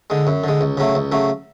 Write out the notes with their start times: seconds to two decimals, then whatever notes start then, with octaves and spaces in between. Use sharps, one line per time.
0.10 D3 G#3
0.27 F#2
0.44 D3 G#3
0.61 C#2
0.77 C#3 F#3 A3
0.95 C#2
1.12 C#3 F#3 A3